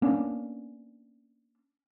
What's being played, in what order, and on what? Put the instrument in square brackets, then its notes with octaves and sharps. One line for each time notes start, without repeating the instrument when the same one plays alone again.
[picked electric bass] A#3 B3 C#4 D4